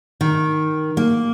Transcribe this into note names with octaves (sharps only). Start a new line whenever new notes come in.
D#3
A#3